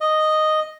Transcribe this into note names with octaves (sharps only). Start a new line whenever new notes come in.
D#5